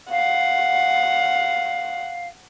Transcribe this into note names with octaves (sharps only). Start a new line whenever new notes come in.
F5 F#5